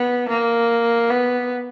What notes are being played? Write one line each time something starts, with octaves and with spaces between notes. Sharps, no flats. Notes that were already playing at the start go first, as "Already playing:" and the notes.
Already playing: B3
A#3
B3